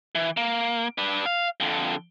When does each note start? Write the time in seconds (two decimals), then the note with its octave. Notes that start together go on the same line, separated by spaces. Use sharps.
0.15 E3
0.37 A#3
0.98 D4 B4
1.26 F5
1.60 F2 D3